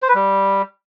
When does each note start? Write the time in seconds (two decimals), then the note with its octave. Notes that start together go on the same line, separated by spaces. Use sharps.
0.02 C5
0.08 B4
0.15 G3